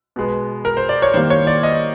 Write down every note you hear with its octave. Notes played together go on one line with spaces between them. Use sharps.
B2 G#3 B3
A#4
C5
D5
C#5
D#3 G3 A#3 C5
C#5
D5
D#5